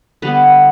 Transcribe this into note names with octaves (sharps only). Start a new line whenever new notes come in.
D3 G3 B3 B4